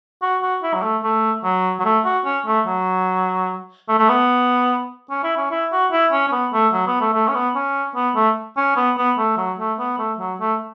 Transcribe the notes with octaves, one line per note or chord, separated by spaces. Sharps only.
F#4
F#4
E4
F#3
A3
A3
F#3
F#3
A3
F#4
C#4
A3
F#3
A3
A3
B3
C#4
E4
C#4
E4
F#4
E4
C#4
C#4
B3
A3
F#3
B3
A3
A3
C#4
B3
C#4
B3
A3
C#4
B3
B3
A3
F#3
A3
B3
A3
F#3
A3